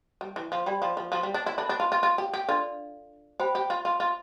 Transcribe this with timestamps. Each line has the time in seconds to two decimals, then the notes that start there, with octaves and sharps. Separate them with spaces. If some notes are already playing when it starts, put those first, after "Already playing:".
0.21 G3
0.36 E3
0.52 F3
0.66 G3 G4 D5 G5 B5
0.82 F3
0.97 F3
1.12 F3
1.23 G3
1.34 D4
1.46 E4
1.58 D4 A4 E5 B5
1.69 D4
1.80 F4
1.92 F4
2.03 F4
2.18 G4
2.34 G4
2.48 D4 F4 A4 D5
3.40 G4 C5 G5 B5
3.55 G4
3.70 F4
3.85 F4
4.00 F4